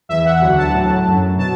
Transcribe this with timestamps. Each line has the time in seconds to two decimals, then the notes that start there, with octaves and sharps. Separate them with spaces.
0.09 E2 E3 E5
0.25 F#5
0.41 D2 D3 F#3 F#5
0.58 A5
0.73 A2 F#3
1.06 F#2 F#3
1.38 B2 F#3 A5